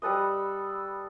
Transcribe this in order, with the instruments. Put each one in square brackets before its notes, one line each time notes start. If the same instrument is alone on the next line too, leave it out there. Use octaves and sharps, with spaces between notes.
[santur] G3 A4 B4 D#5